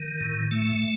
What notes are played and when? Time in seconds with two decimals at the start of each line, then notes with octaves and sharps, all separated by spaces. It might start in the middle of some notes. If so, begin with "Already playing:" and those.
Already playing: D#3
0.21 A2
0.51 A3